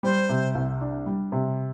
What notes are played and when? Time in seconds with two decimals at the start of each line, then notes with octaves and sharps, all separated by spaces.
0.03 G3 C5
0.29 C3
0.55 C2
0.81 D4
1.06 G3
1.32 C3